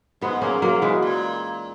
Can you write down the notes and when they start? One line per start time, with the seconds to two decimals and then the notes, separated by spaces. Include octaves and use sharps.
0.21 G#2 G#3 B3
0.42 A#3 C#4
0.62 F#3 A#3
0.82 E3 G#3
1.02 A#2